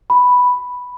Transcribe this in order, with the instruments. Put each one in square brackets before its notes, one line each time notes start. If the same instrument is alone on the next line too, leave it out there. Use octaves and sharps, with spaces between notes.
[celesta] B5